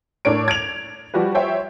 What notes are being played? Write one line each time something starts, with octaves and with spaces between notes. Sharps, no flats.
A2 D4 A#4 C#5 D7
G#6 D7 F7
F3 G3 F#4 G4 B4
C5 C#5 E5 G5